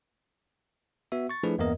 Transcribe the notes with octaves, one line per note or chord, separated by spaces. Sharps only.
B3 F#4 E5
C#6 A6
F3 A3 D4 E4 G#4 B4
E2 G2 A#3 B3 A#4 D#5